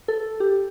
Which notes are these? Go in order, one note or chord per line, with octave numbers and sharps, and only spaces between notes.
A4
G4